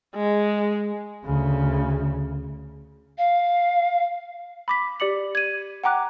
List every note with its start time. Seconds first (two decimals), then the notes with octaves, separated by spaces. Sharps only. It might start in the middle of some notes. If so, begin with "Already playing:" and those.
0.16 G#3
1.24 D2 C#3
3.18 F5
4.68 B5 D6 B6
5.00 G4 D5 D6 C#7 F#7
5.35 G#6 D#7
5.84 F#5 G5 A#5 D6 F#6